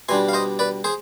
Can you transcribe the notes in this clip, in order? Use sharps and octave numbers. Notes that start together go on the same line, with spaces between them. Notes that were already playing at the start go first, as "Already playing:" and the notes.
B2 G3 D4 G#5 C6
F5
C5 D#5
B4 D5
G#4 C5